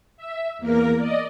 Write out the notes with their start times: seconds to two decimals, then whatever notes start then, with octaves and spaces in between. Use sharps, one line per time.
0.17 E5
0.58 E2 A#3 A#4
0.97 D5 D#5